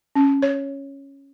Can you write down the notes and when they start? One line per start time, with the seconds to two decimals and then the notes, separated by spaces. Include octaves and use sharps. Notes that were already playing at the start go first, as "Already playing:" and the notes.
0.15 C#4
0.42 C#5